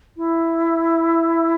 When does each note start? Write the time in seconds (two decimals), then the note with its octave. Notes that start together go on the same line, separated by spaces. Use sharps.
0.17 E4